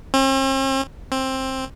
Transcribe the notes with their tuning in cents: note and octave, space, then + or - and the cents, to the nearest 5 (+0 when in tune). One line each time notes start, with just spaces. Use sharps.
C4 +45
C4 +15